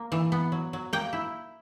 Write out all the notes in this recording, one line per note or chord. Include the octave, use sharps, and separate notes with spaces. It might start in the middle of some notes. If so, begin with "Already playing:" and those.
Already playing: A#3
E3
B3
F#3
F#3
A#3 G5
E4